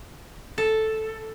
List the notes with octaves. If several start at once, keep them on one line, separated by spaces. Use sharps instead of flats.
A4